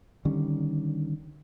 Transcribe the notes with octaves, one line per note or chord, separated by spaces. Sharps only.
D3 D#3 G3 C#4